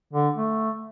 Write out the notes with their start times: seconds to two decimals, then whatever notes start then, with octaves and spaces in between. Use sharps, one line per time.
0.13 D3
0.36 A3